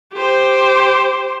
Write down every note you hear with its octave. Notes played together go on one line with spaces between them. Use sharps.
G4 C5